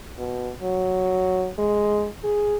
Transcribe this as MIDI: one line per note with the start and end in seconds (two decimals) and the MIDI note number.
0.18 0.51 47
0.62 1.50 54
1.58 2.09 56
2.24 2.57 68